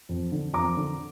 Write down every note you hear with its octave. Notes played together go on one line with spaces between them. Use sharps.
F2
D3
F2 A#5 D6
D3